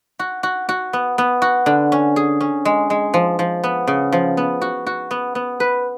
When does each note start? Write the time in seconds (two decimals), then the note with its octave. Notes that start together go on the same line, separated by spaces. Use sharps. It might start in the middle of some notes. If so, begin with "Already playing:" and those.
0.19 F#4
0.43 F#4
0.69 F#4
0.93 B3
1.18 B3
1.42 F#4
1.66 D3
1.92 C#4
2.16 G#4
2.41 C#4
2.65 G#3
2.90 G#3
3.14 F3
3.39 F3
3.63 B3
3.87 C#3
4.12 F3
4.37 B3
4.61 F#4
4.86 F#4
5.11 B3
5.35 B3
5.60 B4